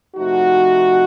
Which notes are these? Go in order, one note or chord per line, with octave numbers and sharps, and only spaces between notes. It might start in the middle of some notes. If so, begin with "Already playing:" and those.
C3 F3 A3 D#4 F#4